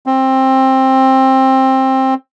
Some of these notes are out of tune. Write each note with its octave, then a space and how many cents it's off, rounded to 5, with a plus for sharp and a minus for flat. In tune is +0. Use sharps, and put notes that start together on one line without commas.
C4 +15